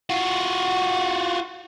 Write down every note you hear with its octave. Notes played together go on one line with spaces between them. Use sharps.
F4 F#4